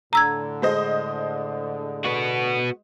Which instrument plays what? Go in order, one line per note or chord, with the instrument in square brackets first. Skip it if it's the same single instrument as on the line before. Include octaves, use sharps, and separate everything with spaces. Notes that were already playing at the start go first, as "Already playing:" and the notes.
[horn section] A2 D3 [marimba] A#5 E6 G#6
[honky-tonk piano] G#3 C5 D#5
[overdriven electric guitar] B3 F#4